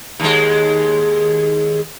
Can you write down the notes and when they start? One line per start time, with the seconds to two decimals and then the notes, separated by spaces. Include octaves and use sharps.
0.20 D#2 G#3